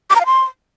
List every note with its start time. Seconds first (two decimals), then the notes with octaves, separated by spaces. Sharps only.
0.10 D6
0.15 A#5
0.21 F5
0.26 C6